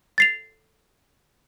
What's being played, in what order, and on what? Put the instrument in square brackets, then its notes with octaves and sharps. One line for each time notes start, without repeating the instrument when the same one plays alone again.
[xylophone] A6 C7 F7